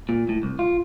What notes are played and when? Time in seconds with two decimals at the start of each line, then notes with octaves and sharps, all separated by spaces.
0.09 A#2
0.29 A2
0.43 C2
0.59 F4